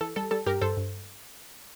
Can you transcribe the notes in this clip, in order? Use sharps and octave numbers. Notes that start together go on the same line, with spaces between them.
E3 A4
G3 A4
G3 A4
G2 G4 A#4
G2 A4 C5
G2